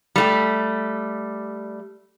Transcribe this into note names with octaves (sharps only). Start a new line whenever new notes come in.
G3 A3 G4